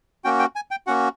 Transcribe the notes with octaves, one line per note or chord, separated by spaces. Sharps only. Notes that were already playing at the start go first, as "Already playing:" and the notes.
A#3 C#4 F#4 G5
G5
G#5
G5
A#3 C#4 F#4 F#5